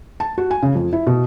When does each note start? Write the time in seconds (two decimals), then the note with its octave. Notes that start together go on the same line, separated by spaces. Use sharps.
0.20 A5
0.38 F#4
0.51 G#5
0.63 C#3
0.75 F2
0.93 E4
1.07 B2